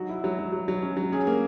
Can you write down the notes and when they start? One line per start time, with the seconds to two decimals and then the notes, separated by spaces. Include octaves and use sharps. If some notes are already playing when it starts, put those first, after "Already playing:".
Already playing: F#3 D#4 F#4
0.09 E4
0.24 F#3
0.39 F#3
0.52 F#3
0.68 F#3
0.82 C#4
0.97 F#3
1.12 C#4 G#4
1.27 A#3